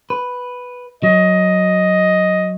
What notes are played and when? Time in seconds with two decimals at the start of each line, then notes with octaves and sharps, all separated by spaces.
0.10 B4
1.03 F#3 D#5